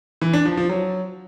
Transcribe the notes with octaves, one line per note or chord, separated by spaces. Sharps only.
E3
D4
F3
F3
F#3